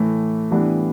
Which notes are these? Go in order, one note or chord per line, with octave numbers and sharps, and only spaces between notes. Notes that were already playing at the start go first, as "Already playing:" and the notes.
Already playing: A2 E3 A3
A2 E3 G3 B3 D4